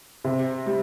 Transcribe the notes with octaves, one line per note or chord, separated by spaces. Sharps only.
C3
G3